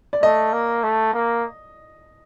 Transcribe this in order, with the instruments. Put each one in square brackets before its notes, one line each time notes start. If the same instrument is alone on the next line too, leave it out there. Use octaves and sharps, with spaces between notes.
[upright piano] D5
[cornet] A3 [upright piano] D#5
[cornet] A#3
A3
A#3